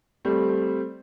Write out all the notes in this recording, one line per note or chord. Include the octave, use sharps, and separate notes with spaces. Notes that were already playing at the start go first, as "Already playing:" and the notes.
G3 A3 C4